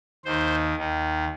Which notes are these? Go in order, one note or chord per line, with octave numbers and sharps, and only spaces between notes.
D#2 D#3 C5
D#2 D#3